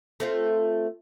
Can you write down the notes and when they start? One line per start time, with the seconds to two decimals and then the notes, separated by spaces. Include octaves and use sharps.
0.20 A3 C4 F4